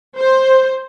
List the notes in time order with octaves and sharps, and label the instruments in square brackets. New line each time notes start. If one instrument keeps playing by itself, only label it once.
[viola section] C5